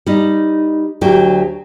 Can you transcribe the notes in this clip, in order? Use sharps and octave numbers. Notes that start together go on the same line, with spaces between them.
G3 D#4
D2 F#3 G4